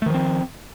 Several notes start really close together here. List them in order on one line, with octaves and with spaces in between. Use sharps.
A3 D#3 F3 C4